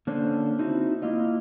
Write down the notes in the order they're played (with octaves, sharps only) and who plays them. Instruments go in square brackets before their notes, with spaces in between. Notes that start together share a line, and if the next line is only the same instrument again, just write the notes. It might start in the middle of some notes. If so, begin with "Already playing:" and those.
[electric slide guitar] D3 A#3 C#4 D4 C5
C4 D#4 E4 F#4
A#3 E4 F4 D#5